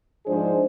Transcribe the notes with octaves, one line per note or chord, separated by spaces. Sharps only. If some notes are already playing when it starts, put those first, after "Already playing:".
G#2 F3 G#3 D4 G#4 C5